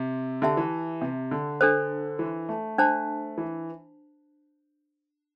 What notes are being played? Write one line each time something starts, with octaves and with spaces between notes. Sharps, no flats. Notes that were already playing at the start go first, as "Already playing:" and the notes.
Already playing: C3
D3 G4 E5 A5
E3
C3
D3
D4 A4 C5
E3
A3
D4 C5 A5
E3